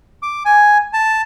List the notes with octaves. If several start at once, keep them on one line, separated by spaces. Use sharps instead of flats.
D6
G#5
A5